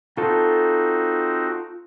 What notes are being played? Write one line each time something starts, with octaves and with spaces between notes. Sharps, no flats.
C4 D#4 F4 F#4 A4